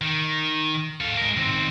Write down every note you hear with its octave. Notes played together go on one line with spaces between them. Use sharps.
D#3
A4 F5
G#3 A#4
D#3 C4